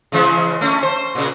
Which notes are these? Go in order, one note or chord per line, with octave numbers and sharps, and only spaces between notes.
C#3 E3 G#3
A3 C#4
C5
A#2 C#3